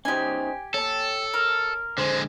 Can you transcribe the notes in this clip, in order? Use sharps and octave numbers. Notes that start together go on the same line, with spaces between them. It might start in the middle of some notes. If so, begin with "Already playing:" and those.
C#4 D#4 G4 C5 G#5
A4 C#5 A5
A#4
D3 G#3 C5 C6